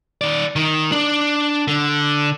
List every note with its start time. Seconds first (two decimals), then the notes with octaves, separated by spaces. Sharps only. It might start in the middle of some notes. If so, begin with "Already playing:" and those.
0.21 D#3 D5
0.56 D#3
0.92 D4
1.68 D3